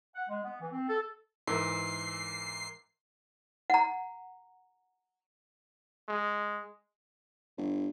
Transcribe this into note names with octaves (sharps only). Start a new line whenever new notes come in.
F#5
G#3
B3
E3
C4
A4
G#2 E3 A#4 E6 C7
F#5 A#5
G#3
G1